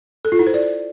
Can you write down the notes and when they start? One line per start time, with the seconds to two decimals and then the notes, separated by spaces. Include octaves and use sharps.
0.25 A4
0.32 F4
0.39 E4
0.47 C5
0.54 D5